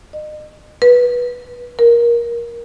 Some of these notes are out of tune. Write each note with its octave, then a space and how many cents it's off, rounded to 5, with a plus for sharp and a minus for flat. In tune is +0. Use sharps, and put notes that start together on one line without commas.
D#5 -35
B4 -15
A#4 +15